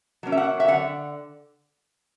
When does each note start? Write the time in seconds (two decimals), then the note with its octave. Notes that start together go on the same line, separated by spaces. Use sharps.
0.23 F#3 A#3 C#4
0.32 E5
0.37 F#5
0.60 E5
0.68 D3 F#5